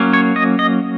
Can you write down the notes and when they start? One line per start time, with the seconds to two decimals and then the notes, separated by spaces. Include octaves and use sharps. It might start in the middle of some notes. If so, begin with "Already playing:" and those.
Already playing: F#3 A#3 C#4
0.13 C#5
0.36 D#5
0.59 D#5